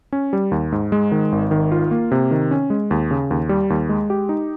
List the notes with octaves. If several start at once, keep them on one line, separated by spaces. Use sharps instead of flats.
C#4
G3
D#2
G#2
G#3
D#3
G#1
D#3
F4
A#3
C3
D#3
C#4
G#3
D#2
C#3
D#2
G3
D#2
G#3
G4
D#4